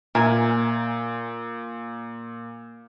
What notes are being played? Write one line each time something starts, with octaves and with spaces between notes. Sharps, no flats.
A#2 A#4 E5 G#5